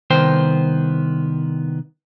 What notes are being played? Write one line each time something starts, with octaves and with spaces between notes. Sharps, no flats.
C2 D#3 B3 C5 G5